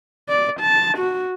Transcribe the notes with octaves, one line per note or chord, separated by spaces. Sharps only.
D5
A5
F#4